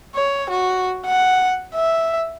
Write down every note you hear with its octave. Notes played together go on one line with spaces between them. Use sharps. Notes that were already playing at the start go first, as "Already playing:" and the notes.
C#5
F#4
F#5
E5